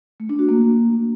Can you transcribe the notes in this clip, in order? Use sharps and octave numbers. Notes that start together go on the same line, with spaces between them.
A3
D4
F#4
A#3